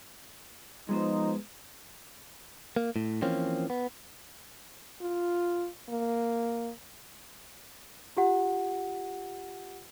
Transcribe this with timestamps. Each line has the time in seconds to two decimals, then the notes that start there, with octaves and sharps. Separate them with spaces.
0.89 F3 G#3 B3 D#4 C5
2.76 A#3
2.96 A2
3.22 E3 F3 A#3 C4 C#4
3.70 B3
5.01 F4
5.89 A#3
8.17 F4 G4 F#5